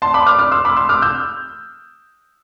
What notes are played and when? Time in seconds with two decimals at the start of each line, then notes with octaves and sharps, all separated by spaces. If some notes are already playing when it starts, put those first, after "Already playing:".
0.02 A5 C6
0.14 B5 D6
0.26 D6 F6
0.39 D6 F6
0.52 C6 E6
0.65 B5 D6
0.77 C6 E6
0.89 D6 F6
1.02 E6 G6